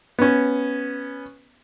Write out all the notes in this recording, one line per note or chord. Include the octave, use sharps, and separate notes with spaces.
B3 C#4